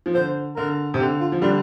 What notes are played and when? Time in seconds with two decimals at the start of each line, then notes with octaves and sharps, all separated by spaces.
0.06 F3
0.14 D3 C5
0.56 D3 A#4
0.94 C3
1.00 D3 G4
1.20 F4
1.32 F3
1.42 D3 G3 D4